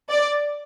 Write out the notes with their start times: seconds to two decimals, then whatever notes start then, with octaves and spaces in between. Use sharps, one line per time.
0.10 D5